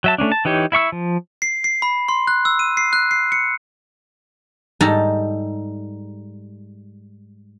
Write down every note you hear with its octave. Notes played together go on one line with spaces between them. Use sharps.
F#3 E5 A5
A3 A#3 C#4 D4
A5
E3 D#4 G4 C#5
E4 E5 C#6 E6
F3
C7
C7
B5
C6
F#6
E6
D#7
C7
F#6
C7
C#7
G#2 G3 D#4 A4 G#5 A#5